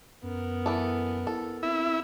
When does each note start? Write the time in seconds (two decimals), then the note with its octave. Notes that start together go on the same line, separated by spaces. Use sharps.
0.23 F#2 B3 A#4
0.66 E3 A4
1.27 E4 A4
1.63 C4 E4